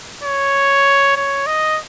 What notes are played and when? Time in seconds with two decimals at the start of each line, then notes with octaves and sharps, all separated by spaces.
0.24 C#5
1.17 C#5
1.47 D#5